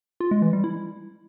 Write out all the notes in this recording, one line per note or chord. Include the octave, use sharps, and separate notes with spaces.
F4
G#3
E3
G3
E4